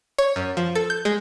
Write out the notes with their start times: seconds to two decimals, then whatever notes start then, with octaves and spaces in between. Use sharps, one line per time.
0.18 C#5
0.36 F#2
0.57 F3
0.75 A4
0.90 G6
1.05 G#3